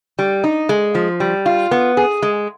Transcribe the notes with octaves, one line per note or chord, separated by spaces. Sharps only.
G3
D#4
G#3
F3
G3
F4
B3
G#4
G#3